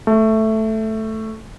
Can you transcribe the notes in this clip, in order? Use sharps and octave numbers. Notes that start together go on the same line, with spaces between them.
A3